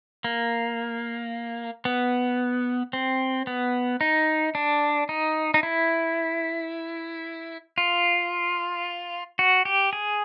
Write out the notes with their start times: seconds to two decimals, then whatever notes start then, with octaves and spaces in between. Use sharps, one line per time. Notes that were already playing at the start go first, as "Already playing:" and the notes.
0.24 A#3
1.85 B3
2.93 C4
3.47 B3
4.01 D#4
4.55 D4
5.09 D#4
5.54 D#4
5.63 E4
7.78 F4
9.39 F#4
9.65 G4
9.93 G#4